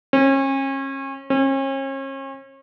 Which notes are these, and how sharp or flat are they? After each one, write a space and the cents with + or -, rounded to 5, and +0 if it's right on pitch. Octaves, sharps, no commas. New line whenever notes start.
C#4 -35
C#4 -40